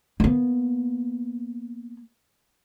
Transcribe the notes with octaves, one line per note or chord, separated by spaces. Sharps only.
A#3 B3